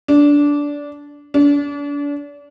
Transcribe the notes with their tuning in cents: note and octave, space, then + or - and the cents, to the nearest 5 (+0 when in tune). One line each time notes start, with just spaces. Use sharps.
D4 -15
D4 -35